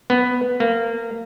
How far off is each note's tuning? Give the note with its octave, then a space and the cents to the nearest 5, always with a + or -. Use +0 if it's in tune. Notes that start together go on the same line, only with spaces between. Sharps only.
B3 +5
A#3 -25